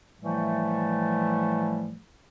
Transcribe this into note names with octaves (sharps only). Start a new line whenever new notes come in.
A2 E3 F3 G3 A3